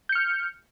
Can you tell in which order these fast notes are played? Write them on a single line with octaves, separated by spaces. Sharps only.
G6 C#7 F6